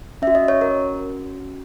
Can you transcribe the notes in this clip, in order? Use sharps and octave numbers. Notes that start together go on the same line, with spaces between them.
C#4 E5
F#4
D#5
C#5
A#4